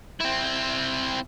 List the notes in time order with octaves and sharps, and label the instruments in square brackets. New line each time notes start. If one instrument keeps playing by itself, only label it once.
[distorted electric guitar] C4 E4